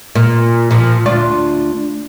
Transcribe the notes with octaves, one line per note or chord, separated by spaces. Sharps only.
A#2
A#2 F3
D2 D4 F4